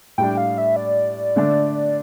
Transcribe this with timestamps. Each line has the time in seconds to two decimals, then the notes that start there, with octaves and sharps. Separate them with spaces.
0.18 A2 G3 D4 G5
0.37 F5
0.58 E5
0.76 D5
1.36 D3 A3 D4